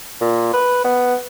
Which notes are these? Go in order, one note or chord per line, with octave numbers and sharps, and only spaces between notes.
A#2
B4
B3